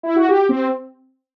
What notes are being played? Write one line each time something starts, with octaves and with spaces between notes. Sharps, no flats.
E4
F#4
G4
C4